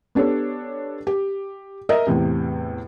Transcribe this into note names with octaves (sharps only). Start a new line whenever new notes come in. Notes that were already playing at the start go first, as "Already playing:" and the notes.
B3 D4 G4 A4 C#5
G4
A#4 D#5 E5
E2 A2 C3